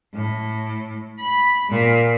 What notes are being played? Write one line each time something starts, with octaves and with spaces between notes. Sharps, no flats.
A2
B5
A#2